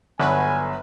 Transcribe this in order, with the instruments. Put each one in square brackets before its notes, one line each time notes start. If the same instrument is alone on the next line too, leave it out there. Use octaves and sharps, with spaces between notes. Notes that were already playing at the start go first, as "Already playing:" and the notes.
[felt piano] G1 [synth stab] D3 F#3 B4 [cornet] G#5